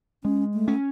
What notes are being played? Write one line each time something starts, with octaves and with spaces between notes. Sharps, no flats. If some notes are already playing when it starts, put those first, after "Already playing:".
G#3 C#4
A3
C#4